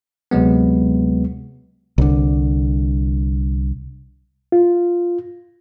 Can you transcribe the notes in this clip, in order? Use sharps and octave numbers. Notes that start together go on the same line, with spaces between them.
D2 C3 F#3 G#3 B3
C2 D3
F4